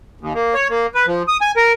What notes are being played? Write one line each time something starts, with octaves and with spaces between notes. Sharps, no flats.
D#2
A#3
C#5
A#3
B4
F3
D#6
G#5
A#4